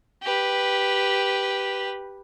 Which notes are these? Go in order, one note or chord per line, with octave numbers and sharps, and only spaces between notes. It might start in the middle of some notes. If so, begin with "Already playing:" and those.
G4 B4